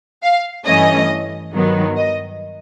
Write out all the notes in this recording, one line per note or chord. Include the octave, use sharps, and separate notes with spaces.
F5
G2 E3 A3 C#4 D#5
G2 D#3 F#3 B3
D#5